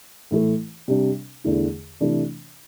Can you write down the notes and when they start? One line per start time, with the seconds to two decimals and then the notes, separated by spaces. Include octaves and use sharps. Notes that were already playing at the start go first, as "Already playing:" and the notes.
0.31 A2 E3 A3
0.88 C3 G3 D4
1.44 E2 D3 A3 E4
2.00 C3 E3 A3 D4